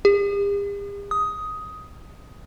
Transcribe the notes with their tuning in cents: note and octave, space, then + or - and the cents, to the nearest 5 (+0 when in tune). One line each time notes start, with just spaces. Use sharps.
G4 +45
D#6 +10